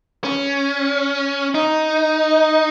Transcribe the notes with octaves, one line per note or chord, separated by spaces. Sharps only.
C#4
D#4